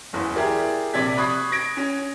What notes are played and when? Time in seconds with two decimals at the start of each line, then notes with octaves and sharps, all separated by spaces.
0.13 F#1 E2
0.35 E4 G4 G#4 A#4 D5
0.93 A#1 C3 D5 G#6 B6
1.17 B5 C#6 D#6 F#6 G#6 C7
1.51 G#6 A#6 D7
1.77 C#4